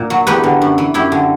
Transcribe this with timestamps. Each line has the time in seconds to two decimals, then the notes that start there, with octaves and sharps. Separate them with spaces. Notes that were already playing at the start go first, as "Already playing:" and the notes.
Already playing: A#2
0.10 F#3
0.27 E2 G4 B4
0.43 D3
0.62 F#2
0.78 E3
0.94 F#2 E4 G4
1.12 D3